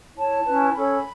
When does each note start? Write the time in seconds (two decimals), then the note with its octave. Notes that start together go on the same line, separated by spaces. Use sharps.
0.16 E4 C#5 A5
0.45 C#4 E4 B4
0.70 A5
0.75 C#4 A4 C#5 B5